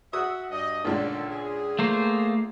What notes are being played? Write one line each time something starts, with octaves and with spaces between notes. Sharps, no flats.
F#4 E5 F#5 D#6 E6
G2 D4 D#5
C#2 A#2 D3 D#3 D4 A4
G#4
A3 A#3 C5